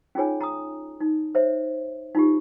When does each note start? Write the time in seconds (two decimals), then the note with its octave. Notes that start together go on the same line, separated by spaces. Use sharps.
0.15 C#4 D#4 F4 G#4 C#5 G#5
0.41 A#5 D#6
1.01 D#4
1.35 C5 C#5 E5
2.15 D#4 F4 G4